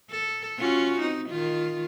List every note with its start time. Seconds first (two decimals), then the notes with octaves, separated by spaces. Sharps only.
0.11 A4
0.59 C#4 F4 F#4
1.00 C4 D#4
1.29 D#3 F4